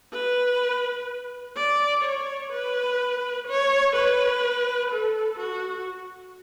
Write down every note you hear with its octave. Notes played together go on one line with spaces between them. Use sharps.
B4
D5
C#5
B4
C#5
B4
A4
F#4